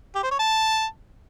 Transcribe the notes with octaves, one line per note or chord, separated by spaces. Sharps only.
G4
C5
C#5
A5